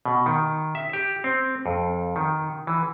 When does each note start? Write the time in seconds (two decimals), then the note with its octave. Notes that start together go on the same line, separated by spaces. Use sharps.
0.05 B2
0.26 D#3
0.75 E5
0.93 G4
1.24 C4
1.66 F2
2.16 D#3
2.67 E3